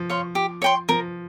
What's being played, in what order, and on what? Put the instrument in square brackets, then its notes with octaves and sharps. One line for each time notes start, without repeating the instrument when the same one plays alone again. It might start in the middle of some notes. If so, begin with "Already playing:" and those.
Already playing: [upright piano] F3
[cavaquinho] C#5 F5 C6
G4
C#5 G5 C6
[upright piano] F3 [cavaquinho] A#4